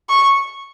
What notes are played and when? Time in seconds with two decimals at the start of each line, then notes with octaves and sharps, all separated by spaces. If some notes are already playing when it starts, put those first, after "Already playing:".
0.09 C#6